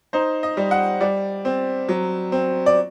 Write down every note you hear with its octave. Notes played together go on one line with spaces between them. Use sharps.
D#4 C5
D#5
G3
F#5
G3 D5
C4
F#3
C4
D5